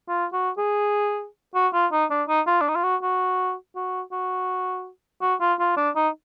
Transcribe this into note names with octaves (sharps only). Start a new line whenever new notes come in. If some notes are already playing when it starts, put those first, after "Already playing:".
F4
F#4
G#4
F#4
F4
D#4
D4
D#4
F4
D4
D#4
F4
F#4
F#4
F#4
F#4
F#4
F4
F4
D4
D#4